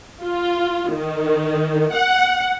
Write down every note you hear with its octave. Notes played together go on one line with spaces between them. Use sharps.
F4
D#3
F#5